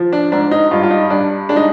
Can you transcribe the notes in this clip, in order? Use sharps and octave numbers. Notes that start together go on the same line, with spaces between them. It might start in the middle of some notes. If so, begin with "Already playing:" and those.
Already playing: F3
D4
G#2 D4
D#4
G2 F4
F4
D#4
G2 D4
G#3 D4
D#4